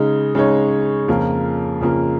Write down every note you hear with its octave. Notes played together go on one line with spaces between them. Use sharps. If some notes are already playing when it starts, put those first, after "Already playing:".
Already playing: C#3 G#3 D#4
C#3 G#3 D#4 C#5
F2 C#3 A#3 F4
F2 C#3 A#3 F4